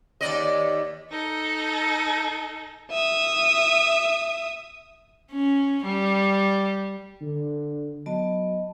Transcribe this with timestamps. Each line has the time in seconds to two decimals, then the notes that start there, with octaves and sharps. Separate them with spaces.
0.21 D#2 D5 D#5
1.11 D#4 A4
2.91 E5 D#6
5.31 C#4
5.85 G3
7.22 D3
8.06 F#3 B3 D#5 A5